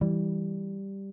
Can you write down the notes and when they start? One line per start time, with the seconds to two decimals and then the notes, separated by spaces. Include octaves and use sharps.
0.01 E3 G3